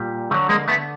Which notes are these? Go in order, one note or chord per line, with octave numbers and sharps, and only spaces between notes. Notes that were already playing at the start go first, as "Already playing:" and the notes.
Already playing: A#2 G3
D3 F#3 A3
G#3 A#3
A3 B3